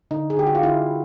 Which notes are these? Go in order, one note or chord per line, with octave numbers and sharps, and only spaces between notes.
D3 D#4
G#4
D3 G4
F#4
F4
D3 E4